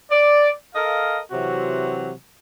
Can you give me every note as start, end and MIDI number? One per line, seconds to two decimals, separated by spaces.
0.10 0.50 74
0.74 1.18 69
0.74 1.18 70
0.74 1.18 75
0.74 1.18 77
1.32 2.12 48
1.32 2.12 52
1.32 2.12 54
1.32 2.12 60
1.32 2.12 66